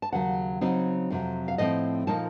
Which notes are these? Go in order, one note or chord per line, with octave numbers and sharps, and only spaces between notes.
A5
D#2 C#3 F#3 F#5
C#3 F#3 C4 D#4
F2 C3 F#3
F5
A2 F3 A3 C4 D#5
A#2 F3 A#3 D#4 A5